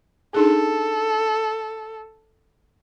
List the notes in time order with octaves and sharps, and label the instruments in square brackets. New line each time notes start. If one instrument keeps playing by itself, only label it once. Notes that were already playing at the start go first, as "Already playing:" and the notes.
[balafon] D4 D#4 G#4 [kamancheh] A4